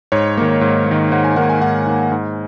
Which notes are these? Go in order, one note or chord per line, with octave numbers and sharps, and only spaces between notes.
G#2 C#5
D#3 A#3
G#2
D#3 A#3
G#2 F#5
G#5
D#3 A#3 F#5
G#5
G#2 F#5
D#3 A#3
G#2